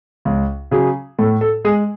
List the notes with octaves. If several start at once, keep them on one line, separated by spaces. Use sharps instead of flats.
C#2
C#3 F#3 G#4
A2 A4
A4
G#3 G#4